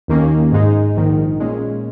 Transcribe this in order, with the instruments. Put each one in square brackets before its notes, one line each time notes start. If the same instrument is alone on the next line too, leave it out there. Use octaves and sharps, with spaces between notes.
[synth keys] D#2 D#3 A#3 C#4
G#2 G#3 D#4
A#1 G#2 D#3
A#2 G#3 C#4